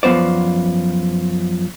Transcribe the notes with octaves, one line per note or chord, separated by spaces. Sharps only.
F#2 F3 B3 C5 D5